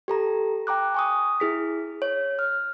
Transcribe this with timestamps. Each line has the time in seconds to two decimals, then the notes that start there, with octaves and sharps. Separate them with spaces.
0.08 G4 A4 A#5
0.67 G5 A#5 D6 F#6
0.94 G#5 C#6 D#6
1.40 E4 G#4 B6
2.02 C#5
2.39 F6